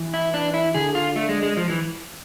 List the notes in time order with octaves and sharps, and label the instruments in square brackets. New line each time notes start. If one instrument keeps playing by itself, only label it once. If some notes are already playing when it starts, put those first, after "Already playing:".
Already playing: [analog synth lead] E3
[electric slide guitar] E4
D4
E4
[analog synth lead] D3 [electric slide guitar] G#4
[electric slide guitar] F4
A3
G#3
G#3
F3
E3